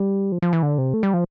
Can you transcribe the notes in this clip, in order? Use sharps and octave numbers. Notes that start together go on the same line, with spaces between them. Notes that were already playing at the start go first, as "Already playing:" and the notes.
Already playing: G3
F3
F3
E3
D3
C3
A3
G3
F3